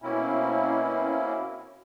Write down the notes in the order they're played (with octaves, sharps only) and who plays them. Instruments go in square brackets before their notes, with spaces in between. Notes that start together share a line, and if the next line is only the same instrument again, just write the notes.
[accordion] B2 A#3 C4 C#4 E4